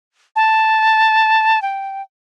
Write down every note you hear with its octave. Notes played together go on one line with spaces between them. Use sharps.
A5
G5